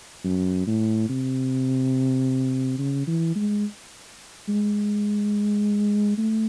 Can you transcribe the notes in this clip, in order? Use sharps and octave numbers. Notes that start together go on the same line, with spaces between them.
F#2
A2
C3
C#3
E3
G#3
G#3
A3